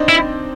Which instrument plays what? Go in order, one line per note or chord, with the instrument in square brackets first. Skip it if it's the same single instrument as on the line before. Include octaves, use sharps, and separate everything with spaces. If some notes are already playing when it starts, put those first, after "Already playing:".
Already playing: [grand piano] C4 D4 D#4
[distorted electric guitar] E4